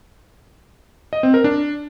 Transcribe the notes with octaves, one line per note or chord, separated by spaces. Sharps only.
D#5
C4
A#4
D4